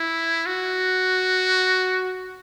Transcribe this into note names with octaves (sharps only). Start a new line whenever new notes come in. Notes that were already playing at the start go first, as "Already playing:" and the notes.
Already playing: E4
F#4